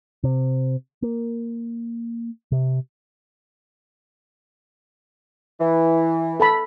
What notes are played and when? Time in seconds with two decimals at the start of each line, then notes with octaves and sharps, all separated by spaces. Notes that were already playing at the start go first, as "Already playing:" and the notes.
0.24 C3
1.02 A#3
2.52 C3
5.60 E3
6.40 A4 A5 B5